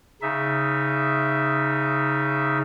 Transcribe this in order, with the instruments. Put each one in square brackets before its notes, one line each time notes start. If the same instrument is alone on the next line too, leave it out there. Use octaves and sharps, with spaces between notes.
[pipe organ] C#3 D#4 E5